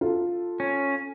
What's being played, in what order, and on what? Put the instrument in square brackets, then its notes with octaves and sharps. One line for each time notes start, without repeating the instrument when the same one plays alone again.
[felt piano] F4 A4
[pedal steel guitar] C#4